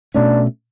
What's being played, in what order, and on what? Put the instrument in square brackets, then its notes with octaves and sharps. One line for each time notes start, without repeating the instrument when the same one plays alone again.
[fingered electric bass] B2 A3 C#4 [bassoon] D4